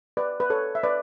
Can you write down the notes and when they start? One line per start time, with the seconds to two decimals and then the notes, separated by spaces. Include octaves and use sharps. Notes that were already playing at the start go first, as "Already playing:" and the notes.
0.17 B4 D5
0.40 B4
0.50 A4 C#5
0.75 E5
0.83 B4 D5